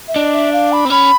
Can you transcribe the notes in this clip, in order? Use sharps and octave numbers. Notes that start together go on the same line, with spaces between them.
E5
D4 D#5
E5
F5
B5
C4
C#4 B5